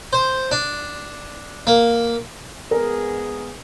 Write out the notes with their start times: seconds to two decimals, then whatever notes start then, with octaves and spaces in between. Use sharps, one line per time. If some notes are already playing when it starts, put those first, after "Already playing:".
0.13 C5
0.51 D4
1.67 A#3
2.71 G#3 B3 G#4 A#4